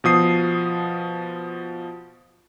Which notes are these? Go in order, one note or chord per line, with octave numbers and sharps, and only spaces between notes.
B2 F3 D#6 C7